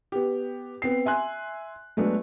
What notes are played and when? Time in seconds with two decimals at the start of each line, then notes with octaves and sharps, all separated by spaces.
0.12 B3 G4
0.82 B3 C4 C7
1.06 E5 G#5 C6 F#6
1.97 F#3 G#3 A3 B3 D4